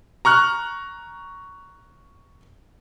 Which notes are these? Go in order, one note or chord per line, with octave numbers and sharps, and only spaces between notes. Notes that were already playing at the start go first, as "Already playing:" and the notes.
A#5 C#6 F6 F#6